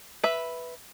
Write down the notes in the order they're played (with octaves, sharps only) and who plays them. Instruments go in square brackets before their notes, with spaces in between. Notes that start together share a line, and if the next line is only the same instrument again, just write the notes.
[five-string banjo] B4 E5